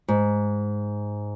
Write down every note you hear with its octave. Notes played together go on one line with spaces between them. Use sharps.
G#2